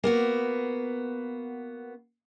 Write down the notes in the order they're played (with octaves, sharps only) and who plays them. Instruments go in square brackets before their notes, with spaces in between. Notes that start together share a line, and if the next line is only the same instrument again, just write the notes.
[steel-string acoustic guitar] A#3 B3 F#4